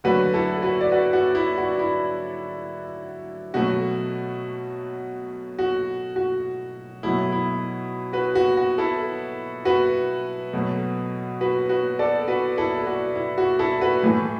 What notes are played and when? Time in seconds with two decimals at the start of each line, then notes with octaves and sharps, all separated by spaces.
0.04 D3 F#3 A3 F#4 B4
0.34 E4 A4
0.62 F#4 B4
0.81 D5
0.92 F#4 B4
1.13 F#4
1.35 E4
1.58 F#4
1.79 E4
3.54 B2 F#3 A3 F#4
5.59 F#4
6.16 F#4
7.03 B2 F#3 A3 E4
7.32 E4
8.13 F#4 B4
8.35 F#4
8.57 F#4
8.78 E4 A4
9.65 F#4 B4
10.53 B2 F#3 A3
11.41 F#4 B4
11.69 F#4 B4
11.99 A4 D5
12.28 F#4 B4
12.57 E4 A4
12.87 F#4
13.16 E4
13.38 F#4
13.59 E4 A4
13.81 F#4 B4
14.03 A2 E3 A3